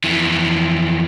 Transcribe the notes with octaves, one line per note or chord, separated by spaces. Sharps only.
F2 E3